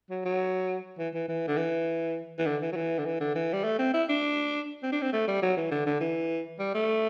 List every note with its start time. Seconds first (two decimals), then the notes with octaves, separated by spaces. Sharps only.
0.10 F#3
0.25 F#3
0.98 E3
1.14 E3
1.28 E3
1.48 D3
1.57 E3
2.39 E3
2.46 D3
2.62 E3
2.72 F#3
2.76 E3
2.98 D3
3.06 E3
3.20 D3
3.35 E3
3.53 G3
3.64 A3
3.79 C4
3.94 E4
4.09 D4
4.83 C4
4.92 D4
5.02 C4
5.13 A3
5.28 G3
5.42 F#3
5.57 E3
5.71 D3
5.86 D3
6.00 E3
6.59 G3
6.74 A3